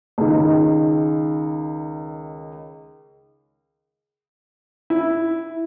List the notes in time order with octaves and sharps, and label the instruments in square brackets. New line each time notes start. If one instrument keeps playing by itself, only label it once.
[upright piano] C#2 D#3
E4